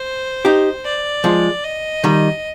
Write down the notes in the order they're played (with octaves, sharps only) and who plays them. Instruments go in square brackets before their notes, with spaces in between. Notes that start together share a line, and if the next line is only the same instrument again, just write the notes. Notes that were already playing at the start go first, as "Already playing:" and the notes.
Already playing: [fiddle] C5
[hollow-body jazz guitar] D#4 G4
[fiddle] D5
[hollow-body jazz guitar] F3 G#3
[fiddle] D#5
[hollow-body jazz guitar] D#3 G3